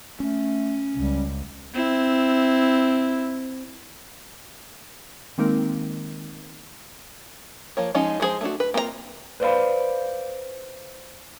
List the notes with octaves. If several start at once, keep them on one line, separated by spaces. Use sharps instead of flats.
A3 C#4
C#2 G3
C4 E4
D#3 G#3 A#3 C4 D#4 A#4
F3 A#3 C#5
F3 G#3 C#4 D#4 F4
F3 G#3 B3 G#4 C5
A3 D4 F#4
B4
A#3 C4 F4 D5 A#5
B4 C5 D5 E5 F5 B5